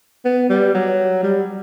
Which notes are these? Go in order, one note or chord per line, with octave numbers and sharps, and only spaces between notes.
B3
G3
F#3
G3